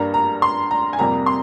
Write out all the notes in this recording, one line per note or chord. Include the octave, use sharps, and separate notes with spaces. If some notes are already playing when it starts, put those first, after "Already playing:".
Already playing: G2 G3 A#3 A#5
A#5
C6
A#5
G#5
F2 C3 G3 A#3 A#5
C6